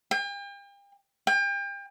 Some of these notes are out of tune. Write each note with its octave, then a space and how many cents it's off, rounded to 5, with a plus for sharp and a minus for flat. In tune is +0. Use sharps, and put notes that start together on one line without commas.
G5 +40
G5 +35